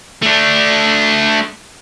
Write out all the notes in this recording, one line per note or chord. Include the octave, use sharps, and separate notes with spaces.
A3 D4